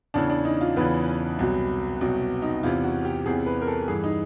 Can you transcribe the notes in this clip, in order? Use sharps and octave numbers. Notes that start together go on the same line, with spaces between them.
E2 C#3 E3 D4
D4
D#4
F4
E2 C#3 E3 B4
C2 B2 F#3
C2 B2 F#3
D#4
E2 C3 E3 F4
F#4
G4
E2 C3 E3 G#4
B4
A#4
A4
G2 E3 G#4
D#4